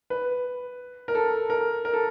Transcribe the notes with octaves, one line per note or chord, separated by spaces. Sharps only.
B4
A#4
A4
A#4
A#4
A4